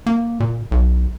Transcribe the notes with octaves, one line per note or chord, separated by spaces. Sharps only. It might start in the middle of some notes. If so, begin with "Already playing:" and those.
A#3
A#2
B1